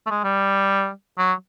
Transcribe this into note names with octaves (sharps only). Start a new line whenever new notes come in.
A3
G#3
G3
F#3